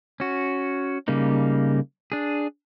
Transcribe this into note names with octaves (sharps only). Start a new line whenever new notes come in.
C#4 F#4
C#3 G3 A#3 D#4
D4 G#4